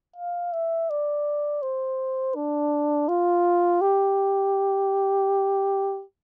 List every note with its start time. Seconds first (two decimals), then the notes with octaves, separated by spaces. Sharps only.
0.16 F5
0.53 E5
0.90 D5
1.62 C5
2.35 D4
3.08 F4
3.81 G4